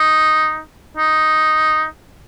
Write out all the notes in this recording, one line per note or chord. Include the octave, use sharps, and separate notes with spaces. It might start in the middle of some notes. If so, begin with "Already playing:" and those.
Already playing: D#4
D#4